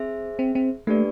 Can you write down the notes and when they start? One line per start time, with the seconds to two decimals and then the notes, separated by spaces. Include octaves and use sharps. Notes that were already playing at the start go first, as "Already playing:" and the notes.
Already playing: C4 G#4 C5 E5
0.39 C4
0.55 C4
0.87 A3 A#3 D4 G4 B4 D5